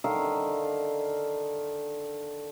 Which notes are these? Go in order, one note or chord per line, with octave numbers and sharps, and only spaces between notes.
D3 D#3 E5 F5